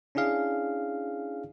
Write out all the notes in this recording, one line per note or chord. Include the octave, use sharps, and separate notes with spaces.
C#4 D4 E4 G#4 F5